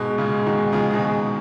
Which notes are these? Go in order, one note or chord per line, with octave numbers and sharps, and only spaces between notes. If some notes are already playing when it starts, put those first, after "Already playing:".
Already playing: G#2 B2 G#3
A#2 C#3
B2 D#3
C#3 F3
B2 D#3